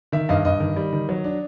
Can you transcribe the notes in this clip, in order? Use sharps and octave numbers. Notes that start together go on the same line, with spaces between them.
D#3 E5
G2 D#5 F5
G2 D#5
D#3
G3
D#3
F#3
D4